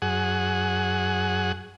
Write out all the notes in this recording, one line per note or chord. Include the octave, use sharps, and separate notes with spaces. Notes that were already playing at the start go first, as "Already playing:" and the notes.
F#2 G#4 F#5